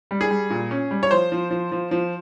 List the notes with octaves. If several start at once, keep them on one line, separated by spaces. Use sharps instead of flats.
G3
G#4
G3
A#2
C#4
G3
C#5
F3 C5
F3
F3
F3
F3